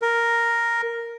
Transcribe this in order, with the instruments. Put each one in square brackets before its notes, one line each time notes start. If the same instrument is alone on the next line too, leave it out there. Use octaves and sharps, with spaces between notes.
[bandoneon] A#4